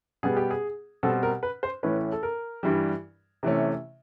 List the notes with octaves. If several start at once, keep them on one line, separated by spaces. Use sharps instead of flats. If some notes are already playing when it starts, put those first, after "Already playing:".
B2 G3 B3 G#4
G4
G#4
B2 G3 C4 A4
A#4
B4
C5
A2 E3 A3 C#4 B4
A4
A#4
G2 E3 G3
C3 E3 A3 C#4